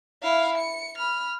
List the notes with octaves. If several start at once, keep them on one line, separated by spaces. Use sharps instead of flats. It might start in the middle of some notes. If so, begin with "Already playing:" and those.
E4 F5
C#7
B5 F6